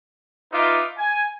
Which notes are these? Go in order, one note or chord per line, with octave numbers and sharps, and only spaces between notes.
D#4 F4 B4 E5 D6
G#5